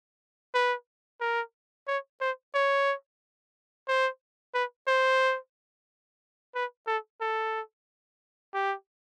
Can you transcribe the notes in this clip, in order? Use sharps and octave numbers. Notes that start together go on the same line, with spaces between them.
B4
A#4
C#5
C5
C#5
C5
B4
C5
B4
A4
A4
G4